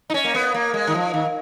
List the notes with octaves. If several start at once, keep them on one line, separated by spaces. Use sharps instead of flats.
D#4
C#4
A#3
B3
A#3
G#3
D#3
F3
D#3